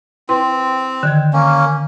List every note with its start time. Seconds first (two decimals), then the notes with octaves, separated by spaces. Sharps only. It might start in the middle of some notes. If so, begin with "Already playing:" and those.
0.29 C4 E4 B4 C6
1.03 D3 D#3 G#6
1.33 A#3 C#4